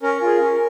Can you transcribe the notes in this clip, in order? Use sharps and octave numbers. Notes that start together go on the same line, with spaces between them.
C#4 A#4
F4 G#4
C#4